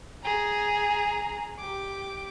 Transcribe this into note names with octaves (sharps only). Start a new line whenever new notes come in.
G#4 A#5
G4 D6